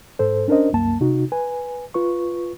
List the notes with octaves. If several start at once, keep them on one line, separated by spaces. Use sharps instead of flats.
G#2 A4 C5
C#4 D4 A#4 C5 D#5
C2 F#2 A#3 A5
C3 D#4 F#4
B4 G#5
F4 B4 C#6